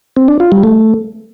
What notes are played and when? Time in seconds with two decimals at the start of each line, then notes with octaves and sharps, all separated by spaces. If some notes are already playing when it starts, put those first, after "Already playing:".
0.16 C4
0.28 D4
0.40 F4
0.52 G3
0.64 A3